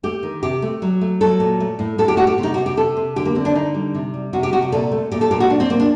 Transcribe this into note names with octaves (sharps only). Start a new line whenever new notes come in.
A3 G4
D#3
C3 G4
A3
F#3
A3
F#3 A4
A#2
A3
A2
A2 A4
G4
A3 F#4
G4
C3
D#4
C3 F#4
G4
C3 A4
C3
D3 G4
A#3
D3 C4
D4
D3 D#4
G3
C3
G3
C3 F#4
G4
C3 F#4
G4
A#2 A4
A3
A#2 G4
A4
A#2 G4
F#4
A#2 D4
C4
A#2 A#3
D4